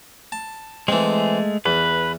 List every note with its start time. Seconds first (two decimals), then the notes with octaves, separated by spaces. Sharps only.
0.32 A5
0.88 E3 G#3 A3 C4
1.66 E2 B4